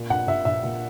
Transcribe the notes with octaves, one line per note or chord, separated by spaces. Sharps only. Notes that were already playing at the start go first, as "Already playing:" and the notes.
Already playing: A#2
A#1 F#5
A#1 E5
A#1 E5
A#2